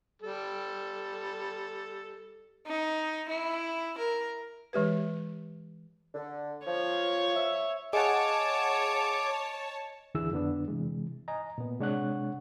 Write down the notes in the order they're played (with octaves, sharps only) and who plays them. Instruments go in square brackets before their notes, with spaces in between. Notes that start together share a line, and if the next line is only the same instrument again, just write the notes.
[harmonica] G3 A4
[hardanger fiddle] D#4
E4
A#4
[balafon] E3 G#3 G4 B4
[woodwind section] D3
[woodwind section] F3 [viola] C#5
[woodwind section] E5
[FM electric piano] G#4 F5 F#5 [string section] C#5 A5 [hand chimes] D#5 G#5 [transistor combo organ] D6
[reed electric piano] D2 D3 E3 E4 G#4 E6
F2 D3 B3 D4
C3 E3 G#3
D#5 G#5 A#5
A#2 B3
C3 G#3 D4 C#5 F#5 F#6